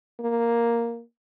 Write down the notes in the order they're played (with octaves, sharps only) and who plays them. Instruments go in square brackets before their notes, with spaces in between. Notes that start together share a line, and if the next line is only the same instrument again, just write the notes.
[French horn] A#3